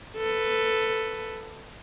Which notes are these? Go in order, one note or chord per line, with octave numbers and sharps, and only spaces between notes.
A4 B4